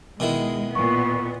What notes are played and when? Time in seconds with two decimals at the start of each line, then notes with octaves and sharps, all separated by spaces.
0.20 B2 D#3 G#3 E4
0.75 A#2 B3 C#6